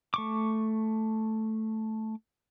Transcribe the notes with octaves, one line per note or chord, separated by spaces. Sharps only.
A3 C#6 D6